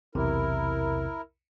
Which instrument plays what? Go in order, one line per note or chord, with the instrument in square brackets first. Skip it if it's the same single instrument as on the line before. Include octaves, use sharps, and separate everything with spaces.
[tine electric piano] B1 E2 C3 [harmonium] E4 A#4